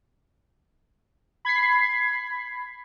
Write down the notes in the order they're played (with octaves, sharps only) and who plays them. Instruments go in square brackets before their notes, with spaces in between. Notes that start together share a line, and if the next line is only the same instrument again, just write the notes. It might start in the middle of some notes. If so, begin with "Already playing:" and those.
[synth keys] B5 G#6 B6 C7